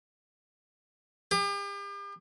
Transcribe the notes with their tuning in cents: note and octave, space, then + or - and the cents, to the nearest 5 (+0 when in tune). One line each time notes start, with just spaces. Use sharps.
G4 +40